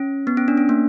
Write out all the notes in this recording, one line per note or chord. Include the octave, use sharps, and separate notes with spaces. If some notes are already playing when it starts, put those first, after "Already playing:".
Already playing: C#4
B3
C#4
D4
C#4
A#3